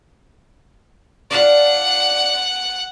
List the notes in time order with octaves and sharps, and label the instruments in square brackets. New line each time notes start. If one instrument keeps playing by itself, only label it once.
[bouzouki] D4 F4 [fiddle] F#5